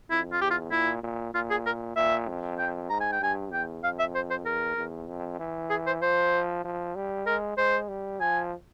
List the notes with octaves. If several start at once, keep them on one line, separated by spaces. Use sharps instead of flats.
F2 E4
F4
E2 G4
F4
A#2 E4
A#2
A#2 F4
G#4
A#4
A#2 E5
F2
G5
G#2 A#5
G#5
G5
G2 G#5
E2 G5
F2 F5
E5
C5
C5
E2 A#4
E2
F2
E3
G#4
C5
F3 C5
F3
G3
G#3 A#4
G#3 C5
G3
F3 G#5